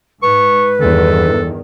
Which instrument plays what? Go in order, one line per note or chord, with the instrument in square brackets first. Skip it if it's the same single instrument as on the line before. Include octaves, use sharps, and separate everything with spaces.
[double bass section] G#2 [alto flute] B4 [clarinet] C#6
[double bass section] E2 G2 D#3 [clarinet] A4